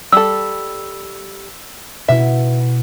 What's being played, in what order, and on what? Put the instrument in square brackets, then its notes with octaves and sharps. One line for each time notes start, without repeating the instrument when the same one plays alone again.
[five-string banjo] G3 A4 [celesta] E6
[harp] B2 E4 [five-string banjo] E5